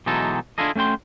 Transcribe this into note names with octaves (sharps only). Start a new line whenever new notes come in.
B2 E3 F#3 G#3 D#4 A4
D4 E4 F4 G#4 A4 D#5
A3 C#4 F#4 G5 C6